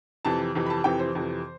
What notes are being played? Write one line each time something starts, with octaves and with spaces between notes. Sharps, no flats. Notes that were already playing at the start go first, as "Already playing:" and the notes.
F2 C3 E3 A5
F2 C3 E3
B5
A5
F2 C3 E3 G5
C5
F2 C3 E3